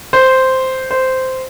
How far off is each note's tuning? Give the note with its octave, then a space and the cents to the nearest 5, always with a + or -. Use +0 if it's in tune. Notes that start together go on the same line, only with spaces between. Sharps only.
C5 -5
C5 -10